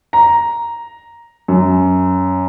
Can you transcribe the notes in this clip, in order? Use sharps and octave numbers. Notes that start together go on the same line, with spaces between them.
A#5
F#2